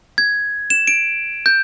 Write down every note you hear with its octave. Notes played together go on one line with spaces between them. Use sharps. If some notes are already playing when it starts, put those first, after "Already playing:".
G#6
E7
D7
G6